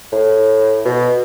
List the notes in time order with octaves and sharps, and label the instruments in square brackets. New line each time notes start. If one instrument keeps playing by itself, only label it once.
[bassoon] A2
B2